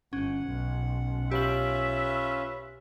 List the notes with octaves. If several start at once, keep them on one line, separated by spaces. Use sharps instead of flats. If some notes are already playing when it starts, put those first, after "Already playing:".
G1 C#4 F#5
B1
C#4 F4 G4 B4 E5 F#7